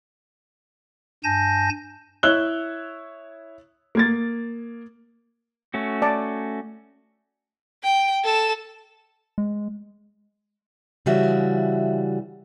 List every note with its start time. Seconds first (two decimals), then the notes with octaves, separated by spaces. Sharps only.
1.24 G2 G#5 A5 G6 A#6
2.23 E4 C#5 E6 F#6 G7
3.95 A#3 G#6 A6
5.74 A3 C#4 F#4
6.02 D5 A5
7.83 G5
8.24 A4 E7
9.38 G#3
11.06 C#3 E3 G3 F#4 E5